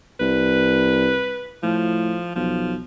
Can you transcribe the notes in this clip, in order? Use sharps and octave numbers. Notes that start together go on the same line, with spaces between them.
C2 B4
A2 F3
B1 F3